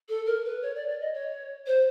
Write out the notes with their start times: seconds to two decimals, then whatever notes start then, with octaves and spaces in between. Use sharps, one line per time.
0.09 A4
0.26 A#4
0.44 B4
0.62 C#5
0.75 D5
0.88 D5
1.00 D#5
1.14 C#5
1.66 C5